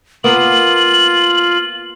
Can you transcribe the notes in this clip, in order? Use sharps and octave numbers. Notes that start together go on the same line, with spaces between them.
A#3 B3 F4 F#7